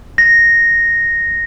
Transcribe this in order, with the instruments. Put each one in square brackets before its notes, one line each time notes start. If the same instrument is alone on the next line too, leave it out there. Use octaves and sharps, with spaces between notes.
[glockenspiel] A#6